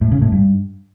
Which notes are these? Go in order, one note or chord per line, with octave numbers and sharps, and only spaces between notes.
A2
C#3
A2
G2